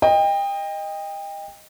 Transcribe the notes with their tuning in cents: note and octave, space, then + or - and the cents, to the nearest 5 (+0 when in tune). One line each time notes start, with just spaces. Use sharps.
D#5 +0 G5 +30